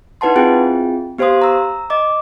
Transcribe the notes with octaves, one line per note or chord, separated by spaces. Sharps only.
D#4 E4 B4 F#5 A5 C6
C4 E4 F4 G#4 G5
B3 G4 C5 F5 C6 D#6
A#5 E6
D#5 D6